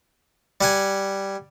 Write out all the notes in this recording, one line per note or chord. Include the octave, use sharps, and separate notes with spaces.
G3 F#5 G#5